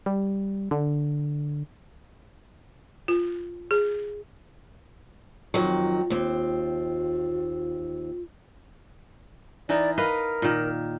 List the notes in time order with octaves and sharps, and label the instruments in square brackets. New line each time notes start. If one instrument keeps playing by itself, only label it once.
[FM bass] G3
D3
[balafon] F4
G#4
[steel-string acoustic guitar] F2 D#3 F#3 [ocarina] F4
[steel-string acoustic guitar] D#2 C4
[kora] E3 D#4 A#4 [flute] D5
[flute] A#4 [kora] B4 D#5 F5
[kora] A#2 D#3